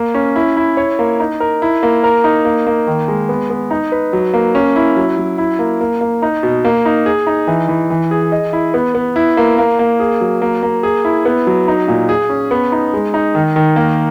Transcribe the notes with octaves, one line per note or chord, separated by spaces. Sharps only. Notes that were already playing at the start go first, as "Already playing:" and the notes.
Already playing: A#3
C#4
E4
E4
C#5
A#3
D#4
A#4
E4
A#3
A#4
D#4
A#3
A#3
D#3
G#3
B3
B3
D#4
B4
F#3
A#3
C#4
E4
F#3
F#3
E4
A#3
A#3
A#3
D#4
B2
A#3
D#4
G#4
D#4
E3
E3
E3
G#4
D#5
E4
B3
B3
E4
A#3
A#3
A#3
G#4
F#3
A#3
A#3
G#4
E4
B3
F#3
D#4
A#2
G#4
C#4
B3
D#4
G#3
D#4
D#3
D#3
A#3